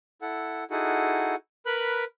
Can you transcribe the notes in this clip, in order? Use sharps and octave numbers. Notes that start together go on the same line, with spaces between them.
E4 A4 F#5
D#4 E4 F#4 G#4 A4 F#5
A#4 B4 B5 F#6